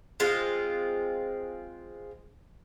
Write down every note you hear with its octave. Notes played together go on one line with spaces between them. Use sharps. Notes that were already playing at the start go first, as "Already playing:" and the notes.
G#3 C4 F4